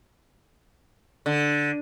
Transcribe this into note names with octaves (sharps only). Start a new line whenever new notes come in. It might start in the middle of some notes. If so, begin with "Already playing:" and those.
D3